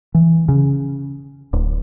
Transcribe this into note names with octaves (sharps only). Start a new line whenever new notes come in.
E3
C#3
D1